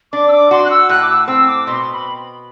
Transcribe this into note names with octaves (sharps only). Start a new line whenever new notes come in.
D4 D6
E6
D6
F#4 C6
F#6
E6
A2 F#6
D6
E6
C4 E6
D6
B2 C6
B5